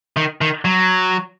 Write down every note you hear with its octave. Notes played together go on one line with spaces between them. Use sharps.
D#3
D#3
F#3